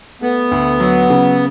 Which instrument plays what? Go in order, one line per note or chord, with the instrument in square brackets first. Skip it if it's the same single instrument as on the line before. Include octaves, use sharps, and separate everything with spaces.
[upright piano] A3 [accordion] B3
[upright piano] D2
F#3
C#3